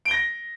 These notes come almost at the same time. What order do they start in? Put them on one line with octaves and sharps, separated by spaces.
D7 G7 A#6